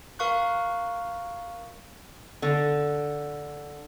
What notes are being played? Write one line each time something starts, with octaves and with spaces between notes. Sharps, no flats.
A#4 F5 C#6 F#6
D3